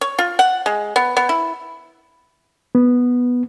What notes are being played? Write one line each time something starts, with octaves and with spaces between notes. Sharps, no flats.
C#5
F4
F#5
G#3
B3
B3
E4
B3